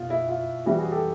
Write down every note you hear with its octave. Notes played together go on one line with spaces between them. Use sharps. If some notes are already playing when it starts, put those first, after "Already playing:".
Already playing: B2 F4
E4
F4
E3 G3 C4 E4 F#4
F#4 G#4
G4 A4